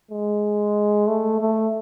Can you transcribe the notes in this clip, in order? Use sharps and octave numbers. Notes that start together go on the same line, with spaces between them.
G#3
A3
A3